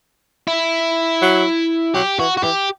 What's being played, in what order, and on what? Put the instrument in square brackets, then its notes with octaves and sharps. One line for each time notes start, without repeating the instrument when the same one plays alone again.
[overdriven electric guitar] E4
[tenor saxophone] F#3
[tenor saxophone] F#3 [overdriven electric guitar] G4
[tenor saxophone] E3 [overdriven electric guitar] F#4
[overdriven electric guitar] F#4
[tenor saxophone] E3 [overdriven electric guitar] G4